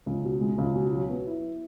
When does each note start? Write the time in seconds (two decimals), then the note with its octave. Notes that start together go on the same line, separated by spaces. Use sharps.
0.06 C#2
0.24 B2
0.41 G#3
0.58 C#2
0.75 B2
0.92 F#3
1.10 B3
1.27 E4